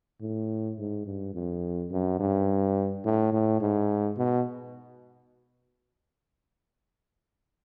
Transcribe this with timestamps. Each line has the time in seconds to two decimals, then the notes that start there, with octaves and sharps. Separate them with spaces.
0.21 A2
0.78 G#2
1.06 G2
1.34 F2
1.91 F#2
2.20 G2
3.05 A2
3.33 A2
3.61 G#2
4.17 B2